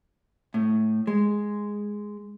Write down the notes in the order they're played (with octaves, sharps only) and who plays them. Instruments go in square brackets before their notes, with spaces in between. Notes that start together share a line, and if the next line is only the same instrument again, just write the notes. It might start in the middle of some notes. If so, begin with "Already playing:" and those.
[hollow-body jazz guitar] A2
G#3